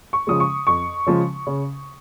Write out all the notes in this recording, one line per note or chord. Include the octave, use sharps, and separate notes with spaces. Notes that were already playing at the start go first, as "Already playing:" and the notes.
C#6
C#3 F3 G#3 D#6
C#6
F2 C#6
C#3 F3 G#3
C#3